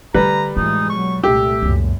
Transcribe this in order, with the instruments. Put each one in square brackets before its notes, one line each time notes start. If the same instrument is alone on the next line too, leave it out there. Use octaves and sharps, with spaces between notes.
[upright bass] D3 E4 [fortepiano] G3 B4 [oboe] A#5
[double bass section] A2 E3 G#3 [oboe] D#4 [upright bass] F4
[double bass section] B2 F#3 [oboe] C#6
[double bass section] C2 A#2 A3 [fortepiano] G4 [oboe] E5
[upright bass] C#2 A#2 [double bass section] F#2